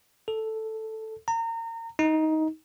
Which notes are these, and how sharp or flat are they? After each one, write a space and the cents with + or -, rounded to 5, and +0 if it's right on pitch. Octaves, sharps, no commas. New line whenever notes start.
A4 +0
A#5 -30
D#4 +15